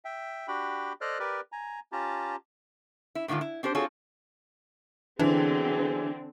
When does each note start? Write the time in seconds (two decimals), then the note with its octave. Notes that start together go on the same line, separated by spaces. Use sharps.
0.05 E5 G5
0.48 D4 F#4 G4 G5 B5
1.01 A4 C5 D5 D#5 F6 F#6
1.19 G4 A#4 B4 D5
1.52 G#5 A#5
1.92 C#4 F4 G4 A5 A#5
3.15 E4
3.28 A2 D3 D#3 G#3 F4
3.41 E4
3.63 C4 D4 G4 C5
3.75 C4 F4 F#4 G#4 A4 C#5
5.19 D3 E3 F#3 B3 C4 D4 G#4